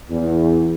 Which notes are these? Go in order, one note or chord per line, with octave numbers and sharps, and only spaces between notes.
E2